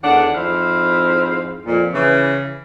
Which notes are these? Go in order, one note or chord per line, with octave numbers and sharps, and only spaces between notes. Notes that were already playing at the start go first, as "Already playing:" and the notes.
E2 A2 D#3 D4 F#5
F2 G#2 C4 E4 C5 F5
F2 A#2
C#3 E3